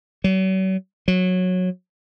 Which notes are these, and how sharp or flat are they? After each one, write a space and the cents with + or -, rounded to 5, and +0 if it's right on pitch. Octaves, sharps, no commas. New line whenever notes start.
F#3 +40
F#3 -15